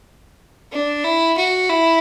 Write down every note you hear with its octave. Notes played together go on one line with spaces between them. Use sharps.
D4
E4
F#4
E4